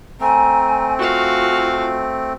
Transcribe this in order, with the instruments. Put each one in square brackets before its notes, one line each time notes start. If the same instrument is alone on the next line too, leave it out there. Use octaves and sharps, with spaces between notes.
[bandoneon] A3 C4 [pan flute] G#5 [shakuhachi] A#5
[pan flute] F4 [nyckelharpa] F#4 F5 [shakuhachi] G#5